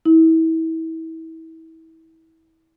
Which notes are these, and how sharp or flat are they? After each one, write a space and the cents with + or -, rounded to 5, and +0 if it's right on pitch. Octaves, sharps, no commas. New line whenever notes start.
E4 -30